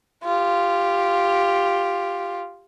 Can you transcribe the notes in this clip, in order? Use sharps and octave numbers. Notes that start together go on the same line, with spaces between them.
F4 G4